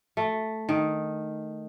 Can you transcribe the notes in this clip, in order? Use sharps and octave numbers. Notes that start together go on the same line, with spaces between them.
A3
D#3